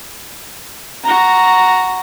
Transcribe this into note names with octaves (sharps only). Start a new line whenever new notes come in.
F#4 A#5